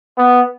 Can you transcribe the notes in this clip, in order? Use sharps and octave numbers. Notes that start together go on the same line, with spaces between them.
B3